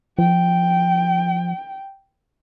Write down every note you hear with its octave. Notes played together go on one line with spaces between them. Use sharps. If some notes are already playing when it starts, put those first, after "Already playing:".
F3 G5